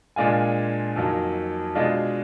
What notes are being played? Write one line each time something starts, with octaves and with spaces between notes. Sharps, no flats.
A#2 G#3 D4 F4 G#5
F2 D#3 F#3 A#3
B2 G#3 D4 F4 D#5